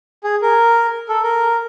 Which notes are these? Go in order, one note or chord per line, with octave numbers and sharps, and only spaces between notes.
G#4
A#4
A4
A#4